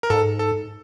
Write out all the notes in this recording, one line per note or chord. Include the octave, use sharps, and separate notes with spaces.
A#4
G#2 A4
A4